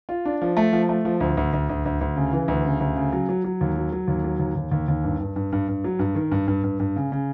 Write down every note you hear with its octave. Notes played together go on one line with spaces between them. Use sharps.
F4
D4
F3
A3
F3
A3
F3
D2
D2
D2
D2
D2
D2
C#3
E3
D2
C#3
D2
C#3
F#3
F#3
F#3
D#2
F#3
F#3
D#2
F#3
D#2
D#2
D#2
D#2
G2
G2
G2
G2
G2
F#3
G2
D#3
G2
G2
G2
G2
C#3
C#3